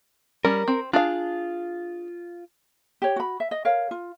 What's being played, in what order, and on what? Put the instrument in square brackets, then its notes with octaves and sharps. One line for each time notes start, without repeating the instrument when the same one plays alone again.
[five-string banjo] G3 C#4 [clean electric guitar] A#4
[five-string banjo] C4
[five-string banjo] D4 G#4 F5 [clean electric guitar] F4
[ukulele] G4 C#5
F#4 B5
E5
D#5
A#4 C#5 F5
F4